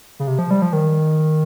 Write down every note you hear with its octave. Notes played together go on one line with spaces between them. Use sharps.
C#3
C3
F3
G3
F3
D#3